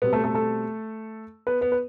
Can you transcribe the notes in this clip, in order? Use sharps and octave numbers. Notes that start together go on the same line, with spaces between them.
B2 G3 B3 C4 B4
A3 A4
A3 A4
A3 A4
B3 B4
B3 B4
B4